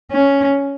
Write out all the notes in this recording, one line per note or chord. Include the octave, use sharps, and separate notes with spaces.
C#4